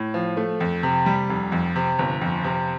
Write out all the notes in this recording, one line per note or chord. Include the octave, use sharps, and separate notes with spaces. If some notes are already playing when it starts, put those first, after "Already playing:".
Already playing: A2
F3
A3
F2
C3
G3
F1
F2
C3
G1
F2
C3